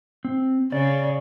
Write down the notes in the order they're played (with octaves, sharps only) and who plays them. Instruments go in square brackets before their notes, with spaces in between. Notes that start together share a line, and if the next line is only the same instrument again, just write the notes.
[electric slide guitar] C4
[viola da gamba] C#3 [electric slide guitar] D5